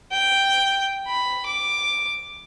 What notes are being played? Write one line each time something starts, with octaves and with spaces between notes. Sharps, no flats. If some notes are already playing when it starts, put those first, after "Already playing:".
G5
B5
D6